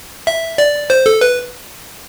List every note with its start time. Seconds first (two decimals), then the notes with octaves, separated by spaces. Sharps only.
0.27 E5
0.58 D5
0.90 C5
1.06 A4
1.21 B4